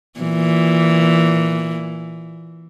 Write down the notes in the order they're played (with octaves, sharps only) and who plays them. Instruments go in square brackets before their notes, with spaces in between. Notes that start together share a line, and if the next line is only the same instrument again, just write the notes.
[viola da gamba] A#2 E3